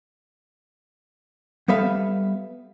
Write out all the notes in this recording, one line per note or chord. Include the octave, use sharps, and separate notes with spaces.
G3 B3 A4 B4 E5 F5